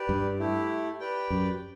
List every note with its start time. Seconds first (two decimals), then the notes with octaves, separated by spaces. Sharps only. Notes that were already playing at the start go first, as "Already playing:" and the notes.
Already playing: G4 B4 D5
0.09 G2
0.39 A3 E4 G4
1.00 G4 B4 D5 G5
1.30 F#2